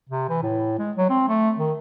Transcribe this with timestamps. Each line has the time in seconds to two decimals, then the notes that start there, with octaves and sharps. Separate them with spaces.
0.09 C3
0.29 E3
0.43 A2
0.79 G#3
0.97 F#3
1.10 C4
1.28 A3
1.58 D#3